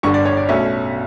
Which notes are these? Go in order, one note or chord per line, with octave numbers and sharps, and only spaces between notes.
G1 G2 D3 C#6
D5
C#5
D5
B1 B2 A3 C#4 E5